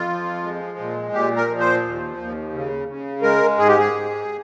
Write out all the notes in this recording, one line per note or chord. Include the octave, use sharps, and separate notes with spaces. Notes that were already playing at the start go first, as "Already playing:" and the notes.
Already playing: F2 F4
F3
G#3
A#2
A#2 G4
A#4
F3
C5
D#2
D#2
C#3
C#3
G#3 A#4
G#2 G#4
G4
G#4
G#2